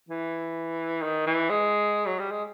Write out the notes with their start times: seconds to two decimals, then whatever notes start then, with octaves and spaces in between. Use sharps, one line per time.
0.09 E3
1.03 D#3
1.26 E3
1.50 G#3
2.07 F#3
2.19 G3
2.31 G#3